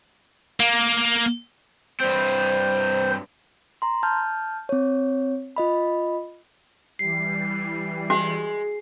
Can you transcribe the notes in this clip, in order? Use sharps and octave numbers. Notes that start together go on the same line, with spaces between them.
A#3
G2 C4 C5
A#5 C6
A5 F6 G6
C4 C#5
F4 D#5 B5
E3 G3 C7
G#3 F#4